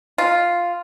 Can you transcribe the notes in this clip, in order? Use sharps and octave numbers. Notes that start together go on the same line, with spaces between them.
F4